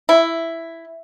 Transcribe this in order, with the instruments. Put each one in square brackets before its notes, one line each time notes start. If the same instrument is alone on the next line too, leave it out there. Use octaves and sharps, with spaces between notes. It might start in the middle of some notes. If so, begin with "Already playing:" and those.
[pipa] E4